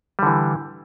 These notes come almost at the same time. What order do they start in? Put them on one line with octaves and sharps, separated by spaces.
G3 D3 E3